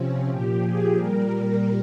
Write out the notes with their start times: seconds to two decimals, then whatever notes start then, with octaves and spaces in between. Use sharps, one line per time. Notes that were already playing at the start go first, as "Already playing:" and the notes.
Already playing: C3 F3 C4 C#4
0.27 A#2 F3 G4
0.62 G#4
0.96 A#2 G3 A#4